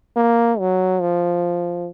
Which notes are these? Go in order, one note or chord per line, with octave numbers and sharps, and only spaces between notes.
A#3
F#3
F3